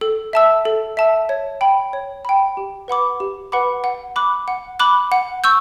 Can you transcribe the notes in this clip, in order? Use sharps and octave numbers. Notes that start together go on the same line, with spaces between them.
A4
E5 A5 E6
A4
E5 A5 E6
C#5
G5 B5
C#5
G5 B5
G4
B4 F#5 B5 D6
G4
B4 F#5 B5 D6
F#5
B5 D6 F#6
F#5
B5 D6 F#6
F#5
C#6 E6 G6